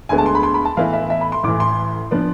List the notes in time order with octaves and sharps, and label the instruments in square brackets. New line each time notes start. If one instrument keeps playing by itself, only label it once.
[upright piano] D2 D3 G#3 B3 G#5
A5
C6
B5
C6
B5
A5
A2 E3 B3 E4 F5
E5
E5
B5
C6
A1 A2 E3 D6
C6
F3 B3 D4